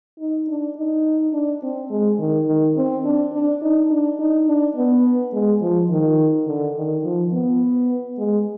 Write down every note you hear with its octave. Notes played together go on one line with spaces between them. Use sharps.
D#4
D4
D#4
D4
C4
G#3
D#3
D#3
C4
D4
D4
D#4
D4
D#4
D4
B3
G#3
F3
D#3
D3
D#3
F3
B3
G#3